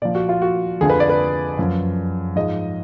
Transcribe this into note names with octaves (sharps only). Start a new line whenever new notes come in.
A#2 F3 D5
F#4
F4
F#4
F2 D3 F3 G#4
B4
D5
B4
F#2 F3
G#2 F3 D#5